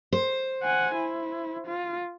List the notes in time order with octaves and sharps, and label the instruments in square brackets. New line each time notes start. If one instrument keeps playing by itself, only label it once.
[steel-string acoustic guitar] C5
[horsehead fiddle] F#5 G#5
E4
F4